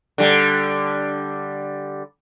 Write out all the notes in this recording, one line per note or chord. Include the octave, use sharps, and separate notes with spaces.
D3 G3